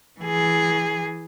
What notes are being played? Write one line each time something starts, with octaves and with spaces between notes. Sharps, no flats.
E3 G#4